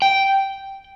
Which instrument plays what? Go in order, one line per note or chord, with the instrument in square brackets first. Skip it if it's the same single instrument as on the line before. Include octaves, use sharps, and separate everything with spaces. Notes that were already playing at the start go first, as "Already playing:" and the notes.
[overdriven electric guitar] G5